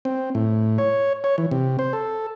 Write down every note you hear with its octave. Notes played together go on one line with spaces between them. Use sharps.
C4
A2
C#5
C#5
E3
C3
C5
A4